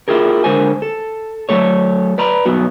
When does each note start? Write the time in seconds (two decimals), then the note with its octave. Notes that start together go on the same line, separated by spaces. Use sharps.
0.08 E4 F4 G4 G#4 A#4
0.44 D3 G#3 A#4 C5 G#5
0.82 A4
1.49 F#3 A3 A4 C#5
2.18 B4 D5 A#5 B5
2.46 B1 G2 F#3 B3 F#4